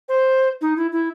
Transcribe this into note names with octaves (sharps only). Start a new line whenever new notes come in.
C5
D#4
E4
E4